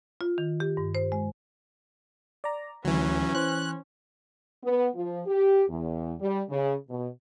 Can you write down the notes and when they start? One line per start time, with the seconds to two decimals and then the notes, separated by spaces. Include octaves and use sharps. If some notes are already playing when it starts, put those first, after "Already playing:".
0.21 F4
0.38 D#3
0.60 G4
0.77 G2
0.95 C5
1.12 G#3
2.44 D5 A#5
2.85 D2 E3 F#3 C#4
3.35 E3 C5 F#6
4.64 B3
4.95 F3
5.27 G4
5.69 E2
6.20 G3
6.50 C#3
6.89 B2